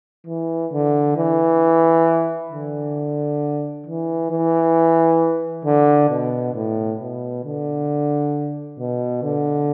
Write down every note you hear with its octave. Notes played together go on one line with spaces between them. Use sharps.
E3
D3
E3
D3
E3
E3
D3
B2
A2
B2
D3
B2
D3